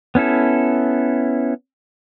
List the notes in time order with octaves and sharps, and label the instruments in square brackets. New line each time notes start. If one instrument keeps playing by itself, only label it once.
[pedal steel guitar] B3 C#4 E4 A4